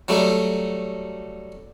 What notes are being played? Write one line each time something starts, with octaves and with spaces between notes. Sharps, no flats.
F#3 G3 A3